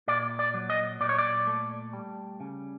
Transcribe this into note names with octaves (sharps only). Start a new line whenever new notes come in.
A#2 D5
D5
F#3
D#5
A#2 D5
C#5
D5
A3
G3
C#3